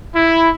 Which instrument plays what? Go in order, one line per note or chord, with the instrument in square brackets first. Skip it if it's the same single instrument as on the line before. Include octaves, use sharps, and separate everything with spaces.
[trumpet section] E4